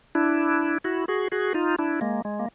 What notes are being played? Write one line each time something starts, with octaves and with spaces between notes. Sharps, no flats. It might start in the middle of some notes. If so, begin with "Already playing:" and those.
D4 E4
E4 F#4
F#4 G#4
F#4 G#4
D#4 F4
D4 E4
G#3 A#3
G#3
A#3